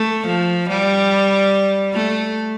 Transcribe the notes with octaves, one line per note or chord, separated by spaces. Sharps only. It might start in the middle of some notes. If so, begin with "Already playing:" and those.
Already playing: A3
F3
G3
A3